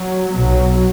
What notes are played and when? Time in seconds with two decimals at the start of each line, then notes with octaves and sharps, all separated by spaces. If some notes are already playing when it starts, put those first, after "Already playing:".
Already playing: F#3
0.33 B1 B2 F#3